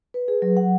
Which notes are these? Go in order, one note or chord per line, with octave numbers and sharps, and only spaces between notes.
B4
G#4
F#3
F#5